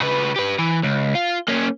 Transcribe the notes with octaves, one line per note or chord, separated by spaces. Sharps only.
C#3 B4
G4 B4
E3
C#2
F4
A#3 C#4